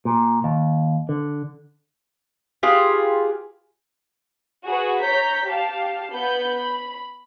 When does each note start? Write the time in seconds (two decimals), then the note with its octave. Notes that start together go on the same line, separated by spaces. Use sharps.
0.05 A#2
0.44 D#2
1.09 D3
2.63 F4 G4 G#4 B4
4.65 F#4 G#4 B4
5.02 C#5 A#5 G6 B6
5.46 G4 F5 A5
6.11 B3 B4 B5 G6
6.54 B5